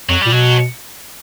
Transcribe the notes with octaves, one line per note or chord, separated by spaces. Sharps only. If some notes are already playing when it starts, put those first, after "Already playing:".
F2 F#3
A#2 G3
B2 F#3